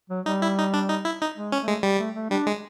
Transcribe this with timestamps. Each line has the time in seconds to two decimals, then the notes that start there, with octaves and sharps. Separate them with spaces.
0.10 F#3
0.26 G3 D#4
0.42 E4
0.58 D#4
0.73 D4
0.89 D#4
1.05 E4
1.21 D#4
1.36 G#3
1.52 C#4
1.61 A3
1.68 G#3
1.83 G3
1.99 A3
2.15 A3
2.30 G3 D4
2.47 G#3